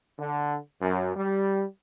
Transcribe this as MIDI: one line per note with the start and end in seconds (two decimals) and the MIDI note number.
0.19 0.56 50
0.81 1.14 42
1.15 1.64 55